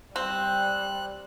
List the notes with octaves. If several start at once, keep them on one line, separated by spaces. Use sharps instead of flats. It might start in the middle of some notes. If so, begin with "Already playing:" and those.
G3 C4 F#6